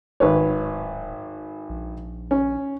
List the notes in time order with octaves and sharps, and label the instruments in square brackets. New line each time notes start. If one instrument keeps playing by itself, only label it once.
[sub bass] D1 [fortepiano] G#1 B4 C#5
[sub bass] A#1
[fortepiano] C#4